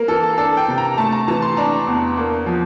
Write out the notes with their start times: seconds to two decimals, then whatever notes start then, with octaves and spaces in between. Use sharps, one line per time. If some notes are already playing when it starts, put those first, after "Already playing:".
Already playing: A#3 A#4
0.08 E3 A4
0.38 D4 A4
0.57 G5
0.68 C3
0.78 A#5
0.98 A3 A5
1.12 A#5
1.28 E3 A5
1.42 C6
1.57 D4 A#5
1.87 E2
2.17 A#3
2.46 F3